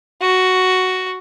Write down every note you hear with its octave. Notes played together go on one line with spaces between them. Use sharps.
F#4